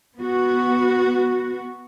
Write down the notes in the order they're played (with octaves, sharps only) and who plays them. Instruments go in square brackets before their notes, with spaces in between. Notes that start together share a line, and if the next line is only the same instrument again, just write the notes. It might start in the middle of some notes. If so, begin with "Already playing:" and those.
[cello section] B3 F#4